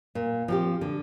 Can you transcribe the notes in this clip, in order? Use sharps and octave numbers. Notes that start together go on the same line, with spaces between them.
A#2
F3 C4 G4
D3